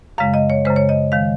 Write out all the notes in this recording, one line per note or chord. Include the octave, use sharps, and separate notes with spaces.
F#2 C#3 G#3 F5
D#5
C#5
F#2 C#3 G#3 C5
C#5
D#5
D#3 G#3 F5